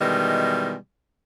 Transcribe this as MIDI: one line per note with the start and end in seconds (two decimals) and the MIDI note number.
0.01 0.75 47
0.01 0.75 51
0.01 0.75 52
0.01 0.75 55
0.01 0.75 56